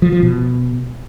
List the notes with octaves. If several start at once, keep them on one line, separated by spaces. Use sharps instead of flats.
F3
F3
B2